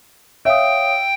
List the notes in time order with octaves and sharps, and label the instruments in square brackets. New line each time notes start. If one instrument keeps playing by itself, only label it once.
[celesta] C#5 F5 D#6 [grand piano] E5 [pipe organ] G5